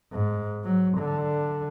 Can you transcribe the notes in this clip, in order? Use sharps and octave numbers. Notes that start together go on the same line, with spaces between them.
G#2
F#3
D3